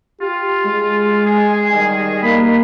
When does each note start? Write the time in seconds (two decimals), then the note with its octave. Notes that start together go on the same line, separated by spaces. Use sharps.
0.21 F4 G4
0.65 G#3
1.25 G#4 G#5
1.73 D#3 G3
2.23 A#3 B5